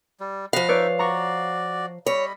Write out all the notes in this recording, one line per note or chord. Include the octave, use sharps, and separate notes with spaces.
G3
F3 D#5 F5 F#5 B5
D#4 B4 C#5 D5 E5
F#4 D5 A#5 C#6
G3 C#5 D#5 B5